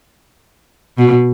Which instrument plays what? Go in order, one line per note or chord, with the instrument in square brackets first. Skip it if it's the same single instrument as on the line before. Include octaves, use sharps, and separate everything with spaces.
[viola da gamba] B2